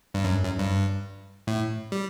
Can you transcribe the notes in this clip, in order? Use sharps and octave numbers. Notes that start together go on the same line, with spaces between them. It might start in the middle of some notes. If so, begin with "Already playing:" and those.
G2
F#2
F#2
G2
A2
G3